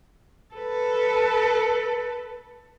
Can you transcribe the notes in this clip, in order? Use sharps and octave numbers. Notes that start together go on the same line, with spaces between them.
A4 B4